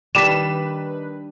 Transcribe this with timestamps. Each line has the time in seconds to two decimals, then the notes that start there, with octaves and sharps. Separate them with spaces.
0.15 D#3 G3 D4 B4 B6 E7